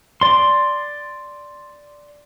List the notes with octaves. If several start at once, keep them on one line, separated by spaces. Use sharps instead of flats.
D5 C6